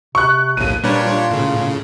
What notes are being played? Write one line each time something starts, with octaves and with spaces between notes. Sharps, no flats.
C3 C#6 F#6
A#1 D#2 A2 D#7
A#2 G3 D4 B4 C#5
F4
A2 C#3